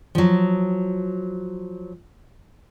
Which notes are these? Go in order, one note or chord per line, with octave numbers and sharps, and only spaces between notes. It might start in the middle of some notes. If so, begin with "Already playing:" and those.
F3 F#3